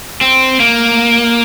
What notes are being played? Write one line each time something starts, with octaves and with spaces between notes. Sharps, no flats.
C4
A#3